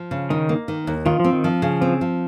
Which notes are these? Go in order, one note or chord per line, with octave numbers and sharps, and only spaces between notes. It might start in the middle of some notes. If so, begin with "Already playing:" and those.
Already playing: F3
C#3
D#3 D#4
A#3
D#3
D#2
D#3 F4
F3 C4
D#3
F3
C#3
F3 C4
F3